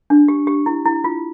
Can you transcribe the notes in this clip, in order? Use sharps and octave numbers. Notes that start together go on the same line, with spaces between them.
D4
G4
G4
E4
E4
F4